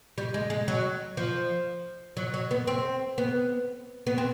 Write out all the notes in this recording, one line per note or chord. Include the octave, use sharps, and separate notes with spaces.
G3
G#3
G#3
F#3
F3
F#3
F#3
B3
C4
B3
B3
C4